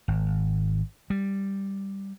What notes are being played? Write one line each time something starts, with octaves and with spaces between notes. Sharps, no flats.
G#1
G3